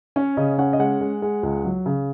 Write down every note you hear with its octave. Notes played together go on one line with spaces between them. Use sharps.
C#4 C#5
C#3 D#5
C#4 F#5
D#5
G#3 F#5
G#3
G#3
C#2
F#3
C#3